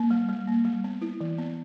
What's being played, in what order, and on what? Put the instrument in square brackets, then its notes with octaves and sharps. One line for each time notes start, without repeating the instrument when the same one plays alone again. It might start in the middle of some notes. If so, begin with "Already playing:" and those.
Already playing: [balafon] A#3
G3
G3
A#3
G3
B3
E4
E3
B3